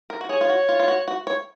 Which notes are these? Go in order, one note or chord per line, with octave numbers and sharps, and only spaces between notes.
A#4
F#4
G#4 C#5
F4
F#4
F4
F4
F#4
F#4
C#5